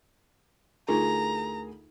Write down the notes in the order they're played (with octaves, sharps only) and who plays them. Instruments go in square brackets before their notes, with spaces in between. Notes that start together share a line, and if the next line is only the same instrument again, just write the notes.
[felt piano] D2 G#4 A#4 [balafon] D#4 F4 [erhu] A#5